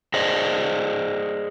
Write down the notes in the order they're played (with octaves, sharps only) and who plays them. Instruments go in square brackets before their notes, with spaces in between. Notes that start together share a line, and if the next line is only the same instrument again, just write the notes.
[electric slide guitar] G#4 C5 D5 D#5